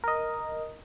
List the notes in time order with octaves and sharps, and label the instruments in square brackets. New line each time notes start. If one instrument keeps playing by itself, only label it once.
[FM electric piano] A#4 D#5